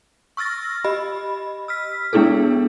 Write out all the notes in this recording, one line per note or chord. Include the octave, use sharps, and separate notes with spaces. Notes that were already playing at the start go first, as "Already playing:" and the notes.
C#6 E6 F6 A6 A#6
G4 D#5 B5
E6 F6 B6
G#3 B3 D4 E4 G#4 A4